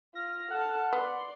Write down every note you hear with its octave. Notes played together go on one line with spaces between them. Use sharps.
F4 F6 A#6
A4 F#5 A5
B3 D5 C6